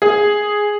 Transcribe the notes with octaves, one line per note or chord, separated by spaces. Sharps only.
G#4